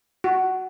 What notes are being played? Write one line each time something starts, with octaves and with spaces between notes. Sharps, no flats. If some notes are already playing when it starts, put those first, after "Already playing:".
F#4